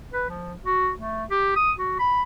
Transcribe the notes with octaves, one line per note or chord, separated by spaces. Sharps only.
B4
F3
F#4
A3
G4
D#6
F#4
B5